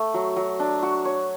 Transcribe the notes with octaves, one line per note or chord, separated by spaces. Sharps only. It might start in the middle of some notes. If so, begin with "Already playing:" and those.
Already playing: A3
F#3
F#3
D4
F#4
C#5